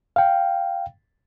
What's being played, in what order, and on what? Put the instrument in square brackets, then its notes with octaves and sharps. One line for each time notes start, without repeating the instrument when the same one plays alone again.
[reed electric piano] F5 G5